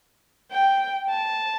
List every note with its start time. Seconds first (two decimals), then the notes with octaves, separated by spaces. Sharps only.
0.51 G5
1.10 A5